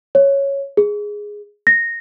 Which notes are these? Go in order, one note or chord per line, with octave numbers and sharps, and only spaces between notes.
C#5
G#4
A#6